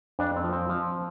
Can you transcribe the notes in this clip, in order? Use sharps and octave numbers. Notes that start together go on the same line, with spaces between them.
F2 D4
C4
F3
C4
F3